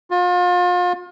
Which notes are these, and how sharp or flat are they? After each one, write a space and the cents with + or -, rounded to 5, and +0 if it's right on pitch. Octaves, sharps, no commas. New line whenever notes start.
F4 +35